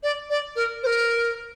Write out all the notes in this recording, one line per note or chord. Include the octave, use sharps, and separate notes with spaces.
D5
D5
A#4
C5
A#4